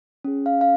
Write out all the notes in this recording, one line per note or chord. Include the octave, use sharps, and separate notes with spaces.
C#4 G#4
F5
F5